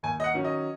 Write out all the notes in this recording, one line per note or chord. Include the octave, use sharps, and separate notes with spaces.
D#2 G#5
D#5
F#5
D#3 F#3 C#4
D#5